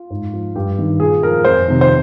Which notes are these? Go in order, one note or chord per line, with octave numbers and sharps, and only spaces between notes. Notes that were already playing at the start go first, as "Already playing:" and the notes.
Already playing: F4
G#2
F3
G2 G4
D#3
A#2 G#4
F3 A#4
F2 C5
C3 D#3
C5